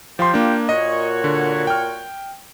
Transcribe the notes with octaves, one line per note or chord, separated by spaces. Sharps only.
F3 F4 G4 G5 C6
A#3 D4
A#2 F#4 C#5 D#5
D3
G5 F6